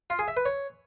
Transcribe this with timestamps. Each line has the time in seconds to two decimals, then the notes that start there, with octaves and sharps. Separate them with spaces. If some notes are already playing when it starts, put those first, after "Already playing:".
0.10 F4
0.19 G#4
0.28 E5
0.37 B4
0.45 C#5